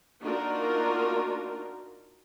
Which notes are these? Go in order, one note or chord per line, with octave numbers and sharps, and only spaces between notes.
A#3 D4 D#4 F4 F#4 A#4